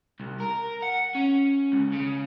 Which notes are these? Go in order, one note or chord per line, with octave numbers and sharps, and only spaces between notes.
C2
A#4
F#5
C#4
C#2
C#3